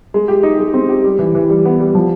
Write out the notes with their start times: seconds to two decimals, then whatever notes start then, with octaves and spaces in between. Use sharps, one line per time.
0.14 G#3
0.28 G4
0.43 D#4
0.59 G#3
0.74 C4
0.89 G4
1.04 G3
1.19 E3
1.35 E3
1.50 G3
1.65 B3
1.80 G3
1.95 F3